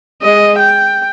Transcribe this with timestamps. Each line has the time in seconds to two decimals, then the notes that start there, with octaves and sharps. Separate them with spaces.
0.22 G#3 D#5
0.59 G5